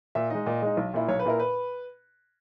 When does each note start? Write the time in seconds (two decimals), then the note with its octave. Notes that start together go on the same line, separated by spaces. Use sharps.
0.15 A#2 E5
0.30 G#3 D#4 D#5
0.46 A#2
0.62 G#3 D#4
0.77 B1
0.94 A#2 A#3 E4
1.09 B1 C#5
1.19 B4
1.25 A#2 A#3 E4 A#4
1.39 B4